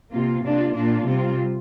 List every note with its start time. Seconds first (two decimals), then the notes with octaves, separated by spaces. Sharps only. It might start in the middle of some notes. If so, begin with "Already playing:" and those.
0.11 C3 A#3 F4
0.43 C3 A#3 D4 F4
0.75 A#2 A#3 D4 F4
1.06 C3 G3 C4 F4